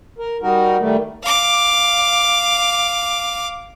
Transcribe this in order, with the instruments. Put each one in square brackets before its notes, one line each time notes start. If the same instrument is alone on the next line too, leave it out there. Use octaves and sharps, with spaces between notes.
[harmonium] A#4
G3 D#4 F#4 A#4
D#3 G3 A3
[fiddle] F5 D6